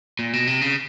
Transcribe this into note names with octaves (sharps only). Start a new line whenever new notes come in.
A#2
B2
C3
C#3